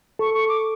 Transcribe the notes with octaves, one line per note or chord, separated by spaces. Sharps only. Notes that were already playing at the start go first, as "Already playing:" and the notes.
A4 C#6
C#6
D6